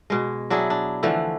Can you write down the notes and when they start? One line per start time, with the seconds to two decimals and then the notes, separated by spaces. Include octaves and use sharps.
0.10 B2 G#3
0.50 F#3 D4 E4 G#4
0.70 D4
1.03 D3 E3 F3 A3